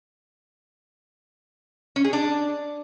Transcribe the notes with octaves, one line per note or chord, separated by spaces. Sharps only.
C#4
G#4
D4